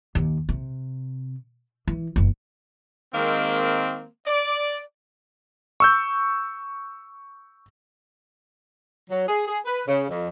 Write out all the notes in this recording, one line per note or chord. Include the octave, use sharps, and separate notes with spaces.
D#2
C3
E3
F#1 E2
D#3 G#3 A#3 C4
D5
C#6 E6 G6
F#3
G#4
G#4
B4
C#3
F2